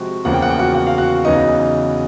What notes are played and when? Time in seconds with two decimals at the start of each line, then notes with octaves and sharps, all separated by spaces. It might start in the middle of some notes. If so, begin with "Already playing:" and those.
Already playing: C3 F3 G#3 C4 F#4
0.25 E2 C#3 F3 A#3 F#5
0.34 G5
0.42 F#5
0.50 G5
0.59 F#4 F#5
0.75 F#5
0.87 F5
0.98 F#4 F#5
1.25 E2 C#3 F#3 B3 D#4 D#5